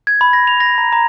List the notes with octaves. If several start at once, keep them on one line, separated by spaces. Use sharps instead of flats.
G#6
B5
A#6
F7
A#6
A#5
A#5